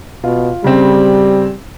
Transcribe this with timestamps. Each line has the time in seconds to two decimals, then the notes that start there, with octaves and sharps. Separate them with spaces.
0.24 B2 F4
0.64 C#3 G3 C4